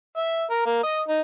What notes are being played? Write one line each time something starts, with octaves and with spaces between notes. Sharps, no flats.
E5
A#4
A#3
D#5
D#4